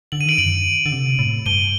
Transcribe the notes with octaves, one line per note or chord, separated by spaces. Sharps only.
D3 F#7
D#7
D#3 D7 F#7
F#2 D7 F#7
D3
C3
A2
G2 D#7 G7